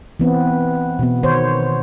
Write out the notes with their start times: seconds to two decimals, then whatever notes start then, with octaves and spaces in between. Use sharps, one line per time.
0.19 E3 B3 C4
0.99 B2 B3
1.23 D#3 C5 C#5